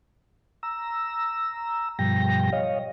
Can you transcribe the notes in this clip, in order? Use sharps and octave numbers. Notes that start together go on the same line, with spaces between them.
A#5 E6
G2 B2 F3 G3 G5 A#6
C#5 D#5 F5